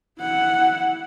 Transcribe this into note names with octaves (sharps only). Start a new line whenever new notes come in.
E4 F#5